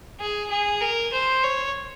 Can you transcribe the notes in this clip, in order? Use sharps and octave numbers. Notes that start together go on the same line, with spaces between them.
G#4
G#4
A#4
C5
C#5